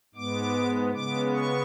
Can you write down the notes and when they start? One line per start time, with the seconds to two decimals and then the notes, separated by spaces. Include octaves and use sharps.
0.15 G#2 G#3 B3 D6
0.94 C#3 G#3 B3 D6
1.33 C#6